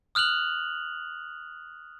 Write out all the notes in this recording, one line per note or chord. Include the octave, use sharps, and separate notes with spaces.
D#6 F6 F#6 F7 F#7